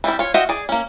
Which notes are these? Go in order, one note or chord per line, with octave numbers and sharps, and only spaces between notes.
E3 G3 C4 E4
F4 C#5
F4 F#4 D#5 E5 G5
G#4 D5
A#3 C#4